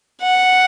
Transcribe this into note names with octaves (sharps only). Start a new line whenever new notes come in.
F#5